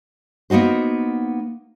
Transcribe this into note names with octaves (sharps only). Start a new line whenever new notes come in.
A#3 B3 D#4 F#4 C5